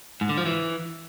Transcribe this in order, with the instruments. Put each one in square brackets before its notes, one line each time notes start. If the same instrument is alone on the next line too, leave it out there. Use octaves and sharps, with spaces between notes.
[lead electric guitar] G#2
D3
F3
E3